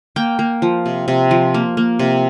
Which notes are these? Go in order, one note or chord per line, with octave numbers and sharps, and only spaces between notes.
A#3 G5
A#3
F3
C3
C3
F3
A#3
A#3
C3